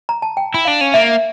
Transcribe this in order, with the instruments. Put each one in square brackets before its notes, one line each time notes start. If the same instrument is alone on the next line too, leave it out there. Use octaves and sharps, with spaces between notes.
[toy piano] A#5
A5
G5
[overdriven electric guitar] E4
[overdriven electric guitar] D4 [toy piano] F5
[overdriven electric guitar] C#4
[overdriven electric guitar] A#3 [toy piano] E5